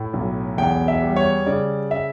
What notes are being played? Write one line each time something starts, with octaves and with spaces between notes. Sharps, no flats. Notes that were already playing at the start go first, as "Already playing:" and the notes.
Already playing: A2
B1
E2 G5
E5
G3
C#5
C#3 D5
E5